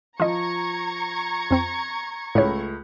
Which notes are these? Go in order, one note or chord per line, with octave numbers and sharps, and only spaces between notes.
F3 F4 D#5 A#5 C#6 G#6
F2 C4
C#2 A2 A3 C#5 B5